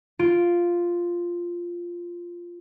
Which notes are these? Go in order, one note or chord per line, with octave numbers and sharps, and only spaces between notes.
F4 D7